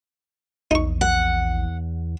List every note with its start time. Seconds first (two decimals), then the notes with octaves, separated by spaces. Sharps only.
0.71 A#1 E2 D#4 C#6
1.01 F#5